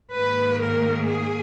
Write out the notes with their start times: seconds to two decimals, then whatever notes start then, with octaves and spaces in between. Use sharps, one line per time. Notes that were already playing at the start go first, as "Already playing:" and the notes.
0.14 G#2 D#3 A#3 B4
0.62 A#4
1.08 G#4